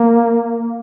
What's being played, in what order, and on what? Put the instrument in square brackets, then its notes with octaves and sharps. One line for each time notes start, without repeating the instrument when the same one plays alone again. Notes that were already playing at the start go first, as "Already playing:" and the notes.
Already playing: [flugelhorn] A#3